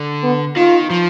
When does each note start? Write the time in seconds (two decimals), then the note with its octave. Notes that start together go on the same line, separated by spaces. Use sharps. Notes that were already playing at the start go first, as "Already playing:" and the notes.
Already playing: D3
0.23 B3
0.56 D#3 F4
0.90 F3